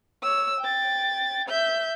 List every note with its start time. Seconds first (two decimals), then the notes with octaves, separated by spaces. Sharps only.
0.22 C#5 E6
0.60 G5 A6
1.49 E5 G6